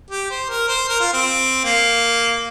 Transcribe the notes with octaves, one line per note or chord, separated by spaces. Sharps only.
G4
C5
A#4
C5
A#4
F4
C4
A#3